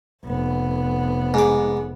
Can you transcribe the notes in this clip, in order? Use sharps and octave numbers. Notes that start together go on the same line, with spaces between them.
F1 B3
G#2 D6